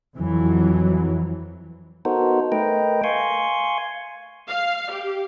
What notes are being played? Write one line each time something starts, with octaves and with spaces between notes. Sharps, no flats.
F2 E3 F#3
B3 D#4 F#4 A4 A#4 C5
A3 A#4 B4 D#5 G5
F5 G#5 C6 C#6
F5
G4